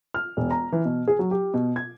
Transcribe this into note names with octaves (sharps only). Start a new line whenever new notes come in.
F6
E1
A#5
E3
B2
G#4
F#3
G4
B2
G#6